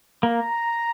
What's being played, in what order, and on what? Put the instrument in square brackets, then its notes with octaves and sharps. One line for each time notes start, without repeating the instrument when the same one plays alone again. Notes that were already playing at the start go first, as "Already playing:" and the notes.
[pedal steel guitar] A#3 [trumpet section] A#5